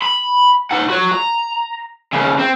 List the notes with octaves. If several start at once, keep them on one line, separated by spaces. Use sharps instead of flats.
B5
D#4 F#5
F#4 C#5
A#5
D#2 C#3
C4